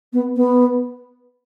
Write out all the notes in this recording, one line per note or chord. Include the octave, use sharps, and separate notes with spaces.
B3
B3